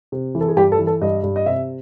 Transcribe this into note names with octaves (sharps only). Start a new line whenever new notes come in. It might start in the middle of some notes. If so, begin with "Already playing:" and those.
C3
E3
A4
G#4
G2 G4
A4
E3
A4
G2 D#5
G2
D#5
C3 E5